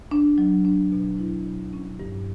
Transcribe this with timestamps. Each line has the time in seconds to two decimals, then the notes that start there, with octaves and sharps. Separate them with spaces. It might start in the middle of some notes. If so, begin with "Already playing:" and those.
0.11 D4
0.38 F#3
0.65 D4
0.92 B2
1.18 E4
1.45 B2
1.73 C#4
2.00 G2